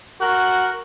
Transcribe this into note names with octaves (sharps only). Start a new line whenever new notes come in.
F#4 A#4 F#6